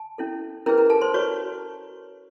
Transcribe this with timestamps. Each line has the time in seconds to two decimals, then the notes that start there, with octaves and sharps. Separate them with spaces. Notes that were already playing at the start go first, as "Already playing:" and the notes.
Already playing: A5
0.18 C#4 E4 A4
0.66 C#4 E4 G#4 A#4 B4 A#5
0.78 A#4 A#5
0.90 A4 A5
1.01 C5 C6
1.14 F#4 B4 C#5 C#6